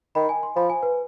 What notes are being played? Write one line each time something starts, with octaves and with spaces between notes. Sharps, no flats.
D#3 B5
G#5
C6
F3 B5
G#5
B4